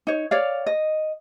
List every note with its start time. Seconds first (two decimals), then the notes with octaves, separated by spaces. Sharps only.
0.07 D#4 C#5
0.31 C#5 D5 F5
0.66 D#5